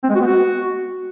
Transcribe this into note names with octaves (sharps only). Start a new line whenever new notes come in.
C4
G#3
F#4
B3
F#4